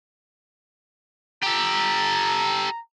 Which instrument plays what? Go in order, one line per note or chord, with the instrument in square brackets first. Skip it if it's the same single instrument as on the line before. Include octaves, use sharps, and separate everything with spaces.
[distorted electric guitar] G4 A4 [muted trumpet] A#5